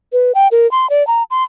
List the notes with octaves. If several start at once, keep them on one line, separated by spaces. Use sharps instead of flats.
B4
G5
A#4
C6
D5
A#5
C6